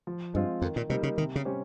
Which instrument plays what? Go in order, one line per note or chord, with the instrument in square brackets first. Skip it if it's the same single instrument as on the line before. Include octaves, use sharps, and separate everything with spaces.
[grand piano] F3
[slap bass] G2 [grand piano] G#3 C4 F4
[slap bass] F2 [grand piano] D#3
[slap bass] A#2
[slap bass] C3 [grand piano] G3 A#3 D#4
[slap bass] C#3
[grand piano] C3 [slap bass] D#3
[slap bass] C#3
[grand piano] G3 C#4 G4 C5